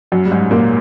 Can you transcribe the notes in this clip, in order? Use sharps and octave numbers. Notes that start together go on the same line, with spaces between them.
F#2 F#3
G3
G#2 G#3
A#2 A#3